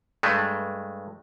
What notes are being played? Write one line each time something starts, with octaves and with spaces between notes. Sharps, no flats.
G2 G#3 A3